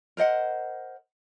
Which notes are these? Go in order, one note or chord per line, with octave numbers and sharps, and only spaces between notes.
A#4 C5 D#5 F#5